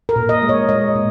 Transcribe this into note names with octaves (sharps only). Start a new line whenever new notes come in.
A#4
A#2
D#5
G#3
C#5
G#3 D#5
A#2